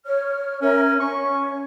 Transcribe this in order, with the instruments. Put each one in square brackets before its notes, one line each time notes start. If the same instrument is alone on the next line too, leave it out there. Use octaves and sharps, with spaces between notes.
[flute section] C#5 F6
[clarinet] C#4 [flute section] A#4 C#5 E5
[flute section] C#4 [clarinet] C#6